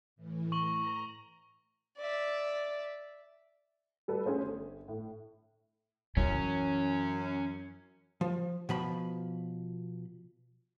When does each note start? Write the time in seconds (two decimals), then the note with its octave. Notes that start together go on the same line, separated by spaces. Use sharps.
0.16 A2 E3
0.52 A#5 C#6 F#7 G7
1.98 D5 E5
4.08 G3 A4 B4
4.26 A3 C#4 G#4 C5 C#5
4.42 G1
4.88 A2
6.17 F#2 E3 C#4
8.21 F3
8.69 B2 F3 B5